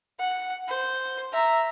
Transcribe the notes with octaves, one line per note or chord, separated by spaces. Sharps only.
F#5
C5
E5 A#5